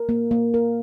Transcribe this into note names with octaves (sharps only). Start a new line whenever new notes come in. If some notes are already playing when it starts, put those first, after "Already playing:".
Already playing: A#4
A#3
A#3
A#4